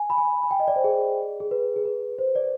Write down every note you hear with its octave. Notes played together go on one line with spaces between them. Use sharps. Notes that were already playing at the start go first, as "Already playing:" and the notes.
Already playing: G#5
B5
G#5
G#5
G5
D#5
D5
C5
G#4
G#4
B4
G#4
B4
C5
D5